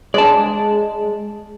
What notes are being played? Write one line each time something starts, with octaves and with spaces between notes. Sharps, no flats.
G#3 D5 A5